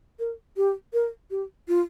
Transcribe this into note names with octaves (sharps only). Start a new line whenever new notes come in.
A#4
G4
A#4
G4
F4